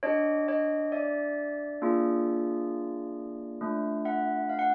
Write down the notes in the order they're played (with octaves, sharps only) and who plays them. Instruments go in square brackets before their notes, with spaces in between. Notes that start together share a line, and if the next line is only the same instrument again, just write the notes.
[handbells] D4 G4 C#5 D#5
C#5 D#5
D5 E5
A#3 D4 F4 G#4
A3 D4 F4
E5 F#5
F5
F#5